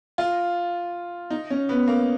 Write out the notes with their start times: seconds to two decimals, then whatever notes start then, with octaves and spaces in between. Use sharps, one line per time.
0.18 F4
1.30 D#4
1.50 C#4
1.69 B3
1.88 A#3